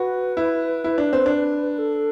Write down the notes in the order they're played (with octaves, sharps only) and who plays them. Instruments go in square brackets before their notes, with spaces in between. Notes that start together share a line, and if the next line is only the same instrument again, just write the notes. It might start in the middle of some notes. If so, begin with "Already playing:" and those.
Already playing: [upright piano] F#4 [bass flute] B4
[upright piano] E4
E4
D4
C4
D4
[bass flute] A4